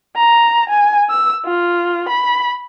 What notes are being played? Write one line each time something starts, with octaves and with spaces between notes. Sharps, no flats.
A#5
G#5
E6
F4
B5